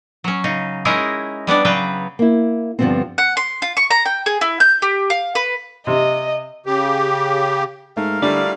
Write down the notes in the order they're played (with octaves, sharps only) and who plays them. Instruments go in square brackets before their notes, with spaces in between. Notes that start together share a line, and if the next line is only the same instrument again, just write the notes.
[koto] F#3 C#4
C#3 D#4
G#3 C#4 D#4 E4 G#4 A#4
G3 B3 D4 D5
C#3 F#3 B3 B4 G5
[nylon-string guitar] A#3 E4
G2 D3 F3 G3 B3 C4
[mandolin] F#5
C6
F4
C#6
A#5
G5
G#4
E4
G6
G4
F5
B4
[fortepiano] C3 [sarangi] D#5
[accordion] C#3 G4
[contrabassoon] G#2 [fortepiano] A3 [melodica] A#4 F5
[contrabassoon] D3 [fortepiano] G3 A3 E4 [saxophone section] F4 D5